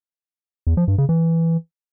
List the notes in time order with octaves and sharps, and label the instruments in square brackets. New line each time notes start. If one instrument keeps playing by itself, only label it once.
[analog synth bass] E2
F3
G2
C#3
E3